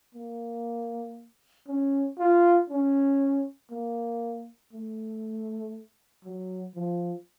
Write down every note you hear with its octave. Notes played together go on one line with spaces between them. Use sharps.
A#3
C#4
F4
C#4
A#3
A3
F#3
F3